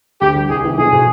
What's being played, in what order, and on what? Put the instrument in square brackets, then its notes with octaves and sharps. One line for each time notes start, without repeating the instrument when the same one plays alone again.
[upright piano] D2 [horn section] G4
[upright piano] D3 G3
[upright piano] C2 [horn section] G#4
[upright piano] C3 D#3 B3
[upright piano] B1 [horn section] G#4
[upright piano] B2 B3